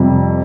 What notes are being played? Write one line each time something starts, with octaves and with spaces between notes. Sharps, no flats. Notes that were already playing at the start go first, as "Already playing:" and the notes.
Already playing: F2 C3 G3